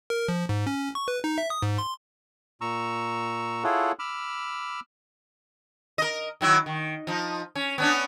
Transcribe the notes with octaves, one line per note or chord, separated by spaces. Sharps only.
A#4
F3
G#2
C#4
C#6
B4
D#4
E5
D#6
G#2
C6
A#2 A#5 C#6 E6
E4 F4 G#4 A4 C#5 F#5
B5 D6 E6 F6
A#4 D#5
D#3 F#3 E4
D#3
F3 D#4
C#4
B3 C#4 D4